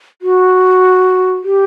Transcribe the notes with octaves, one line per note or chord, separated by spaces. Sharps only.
F#4
G4